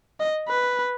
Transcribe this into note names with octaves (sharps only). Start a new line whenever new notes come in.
D#5
B4